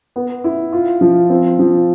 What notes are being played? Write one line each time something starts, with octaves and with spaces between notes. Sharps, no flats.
B3
E4
F4
F3
C4
F3